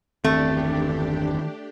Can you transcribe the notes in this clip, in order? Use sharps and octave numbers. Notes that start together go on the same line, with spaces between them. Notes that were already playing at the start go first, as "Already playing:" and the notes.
G1 E2 D#3 A3 C4 D4 G4